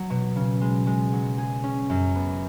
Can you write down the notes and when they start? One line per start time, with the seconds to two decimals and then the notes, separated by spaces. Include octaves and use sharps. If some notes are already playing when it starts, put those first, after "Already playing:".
Already playing: F#3
0.10 B2
0.36 C#3
0.61 G#3
0.87 G#3
1.13 F#3
1.38 G#4
1.64 C#4
1.90 F#2
2.15 B3